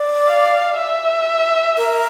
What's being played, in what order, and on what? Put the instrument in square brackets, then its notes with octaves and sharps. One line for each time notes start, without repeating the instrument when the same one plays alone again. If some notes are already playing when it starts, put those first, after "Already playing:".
Already playing: [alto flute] D5
[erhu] F5
E5
[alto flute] A#4